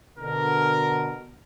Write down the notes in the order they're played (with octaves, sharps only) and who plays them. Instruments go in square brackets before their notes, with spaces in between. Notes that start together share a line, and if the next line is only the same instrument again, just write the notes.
[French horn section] B2 D3 [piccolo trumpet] A#4